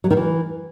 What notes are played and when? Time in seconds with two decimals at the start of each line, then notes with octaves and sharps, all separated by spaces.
0.04 F#3
0.11 D#3
0.17 E3